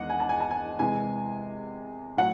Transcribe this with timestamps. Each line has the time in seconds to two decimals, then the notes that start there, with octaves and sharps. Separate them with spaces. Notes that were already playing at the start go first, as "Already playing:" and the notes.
Already playing: E2 D#3 G#3 D#5 F#5
0.10 G#5
0.20 A5
0.29 G#5
0.40 A5
0.51 G#5
0.79 C3 E3 G#3 G#5
2.17 A2 F#3 F#5